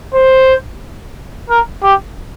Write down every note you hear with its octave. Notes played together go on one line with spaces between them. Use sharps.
C5
A#4
G4